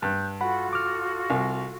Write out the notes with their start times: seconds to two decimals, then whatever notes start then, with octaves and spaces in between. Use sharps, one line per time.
0.02 G2 F#6 G6
0.41 F4 F#4 A4 F#5 B5
0.73 D6 F6
1.30 C2